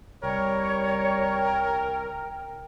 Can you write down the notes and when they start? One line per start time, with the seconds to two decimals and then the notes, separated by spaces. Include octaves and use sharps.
0.23 C2 G3 A#4 C#5 G5